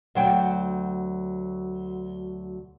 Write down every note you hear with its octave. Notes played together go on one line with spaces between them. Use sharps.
D2 F#3 G5